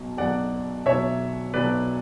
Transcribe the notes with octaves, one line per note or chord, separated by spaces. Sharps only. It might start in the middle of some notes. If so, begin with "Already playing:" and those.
Already playing: B1 B2 F#3
B1 B2 F#3 D5 F#5
B1 B2 F#3 C#5 E5
B1 B2 F#3 B4 D5